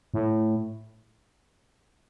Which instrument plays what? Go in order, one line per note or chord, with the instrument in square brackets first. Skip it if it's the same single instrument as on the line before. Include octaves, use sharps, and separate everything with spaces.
[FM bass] A2